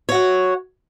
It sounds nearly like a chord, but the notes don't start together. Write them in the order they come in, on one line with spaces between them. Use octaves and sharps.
C#5 F#4 F#5